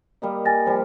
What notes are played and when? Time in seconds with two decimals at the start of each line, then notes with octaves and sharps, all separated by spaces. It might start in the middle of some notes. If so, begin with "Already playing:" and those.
0.22 G3 A#3 D#5
0.45 G3 G#5 A6 A#6
0.66 F3 G3 G4